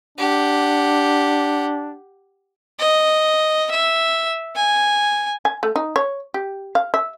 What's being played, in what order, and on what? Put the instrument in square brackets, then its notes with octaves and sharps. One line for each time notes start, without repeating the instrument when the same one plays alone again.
[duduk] D4 [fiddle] G4 F#5
[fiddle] D#5
E5
G#5
[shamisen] G#5
A3
D#4
C#5
G4
F5
E5